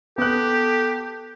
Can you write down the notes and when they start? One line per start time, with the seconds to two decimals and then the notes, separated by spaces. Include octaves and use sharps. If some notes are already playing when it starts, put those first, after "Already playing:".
0.18 B3 G4 A4 F#6